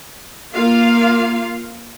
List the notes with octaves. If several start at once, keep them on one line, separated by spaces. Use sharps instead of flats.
A#3 F4 F5